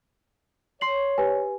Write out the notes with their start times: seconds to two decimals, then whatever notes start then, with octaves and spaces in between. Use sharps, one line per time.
0.81 C#5 C6 C7 F#7
1.18 G4 B4 G#5